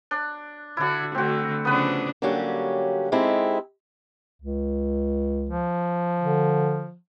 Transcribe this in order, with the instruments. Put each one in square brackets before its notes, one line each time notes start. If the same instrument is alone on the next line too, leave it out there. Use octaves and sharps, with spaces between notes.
[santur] D4
[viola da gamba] D3 F#4 [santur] D4 E4
[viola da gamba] D3 A3 [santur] C4 F#4
[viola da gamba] C#3 F3 D4 [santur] B3 B4
[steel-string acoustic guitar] D3 F#3 G3 A#3 C#4 G4
G#3 C4 D#4 E4 G4 A4
[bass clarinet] C#2
[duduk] F3
[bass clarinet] D3